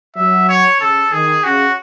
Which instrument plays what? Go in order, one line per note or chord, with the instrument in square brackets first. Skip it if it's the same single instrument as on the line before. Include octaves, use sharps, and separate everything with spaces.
[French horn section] F#3 [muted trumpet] E5
[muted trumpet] C#5
[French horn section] C#3 [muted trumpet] A4
[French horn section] D#3 [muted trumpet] G#4
[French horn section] C#3 [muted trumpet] F#4